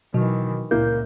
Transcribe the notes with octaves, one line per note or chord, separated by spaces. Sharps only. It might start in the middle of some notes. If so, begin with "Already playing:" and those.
B2 D#3 E3 F#3
C#2 A#2 A#3 E4 G6